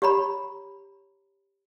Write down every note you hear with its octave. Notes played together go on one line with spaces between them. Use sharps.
G4 C#5 A#5 B5